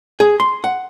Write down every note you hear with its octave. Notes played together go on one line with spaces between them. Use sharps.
G#4
C6
F#5